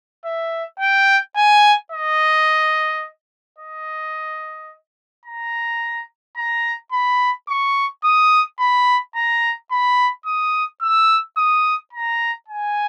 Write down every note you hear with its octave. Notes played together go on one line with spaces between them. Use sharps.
E5
G5
G#5
D#5
D#5
A#5
A#5
B5
C#6
D#6
B5
A#5
B5
D#6
E6
D#6
A#5
G#5